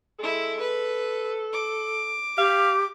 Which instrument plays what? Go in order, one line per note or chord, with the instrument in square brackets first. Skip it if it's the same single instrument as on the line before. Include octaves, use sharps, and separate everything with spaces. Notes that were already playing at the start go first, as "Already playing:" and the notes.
[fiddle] G#3 E4 [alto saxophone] A4
[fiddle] B4
D6
[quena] G4 [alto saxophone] F5